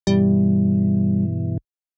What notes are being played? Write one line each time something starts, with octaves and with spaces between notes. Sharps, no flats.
G2 B2 E3 G3